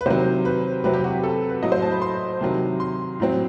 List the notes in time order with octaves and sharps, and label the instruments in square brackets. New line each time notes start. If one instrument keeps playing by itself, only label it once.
[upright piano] B4
C3 D#3 F#3 C5
B4
C3 F#3 C4 B4
G4
F#4
G4
A4
B4
A2 F#3 A3 D#5
C5
A5
B5
C6
C3 D#3 F#3
C6
A2 F#3 C4